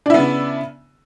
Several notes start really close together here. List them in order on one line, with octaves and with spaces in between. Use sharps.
D4 E4 B3 C#3